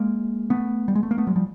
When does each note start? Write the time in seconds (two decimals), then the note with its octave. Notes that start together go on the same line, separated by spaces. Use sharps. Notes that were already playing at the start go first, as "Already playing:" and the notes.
Already playing: G#3 A#3
0.50 A3 B3
0.88 G3
0.95 G#3
1.03 A3
1.11 A#3
1.18 A3 B3
1.27 F#3 G#3
1.36 F3 G3